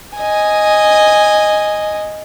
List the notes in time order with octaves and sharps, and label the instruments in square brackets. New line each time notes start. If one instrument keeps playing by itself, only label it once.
[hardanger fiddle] D#5 G#5